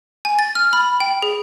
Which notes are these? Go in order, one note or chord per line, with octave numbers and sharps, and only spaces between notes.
G#5
A6
F6
B5
G5
G#4